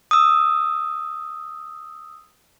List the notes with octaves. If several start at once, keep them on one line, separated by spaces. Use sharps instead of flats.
D#6 E6